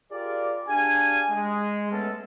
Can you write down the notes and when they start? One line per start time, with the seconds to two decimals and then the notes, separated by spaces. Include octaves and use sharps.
0.12 F4 G4 G#4 A#4 D5
0.68 D4 G4 G#4 F5 G#5
1.31 G#3
1.92 G#3 A3 B3 C#4 A4